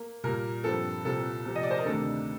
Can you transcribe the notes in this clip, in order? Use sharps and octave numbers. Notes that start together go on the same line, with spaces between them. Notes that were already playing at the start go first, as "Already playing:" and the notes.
Already playing: A#3
A#2 G3 A#3 A#4
G2 F3 C4 A4
C2 A#2 G3 C4 A4
C3 F3 C4
D#5
D5
C5
A#4
D2 C3 D#3 A3 D4 A4